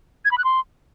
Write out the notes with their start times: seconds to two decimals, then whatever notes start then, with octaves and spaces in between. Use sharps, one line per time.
0.25 G#6
0.31 B5
0.38 F#6
0.44 C6